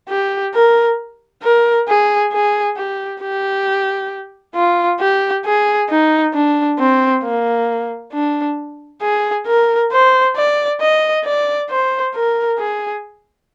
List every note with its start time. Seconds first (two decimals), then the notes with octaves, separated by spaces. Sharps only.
0.09 G4
0.54 A#4
1.43 A#4
1.88 G#4
2.32 G#4
2.77 G4
3.21 G4
4.55 F4
5.00 G4
5.45 G#4
5.89 D#4
6.34 D4
6.79 C4
7.23 A#3
8.12 D4
9.01 G#4
9.47 A#4
9.92 C5
10.37 D5
10.81 D#5
11.25 D5
11.70 C5
12.15 A#4
12.59 G#4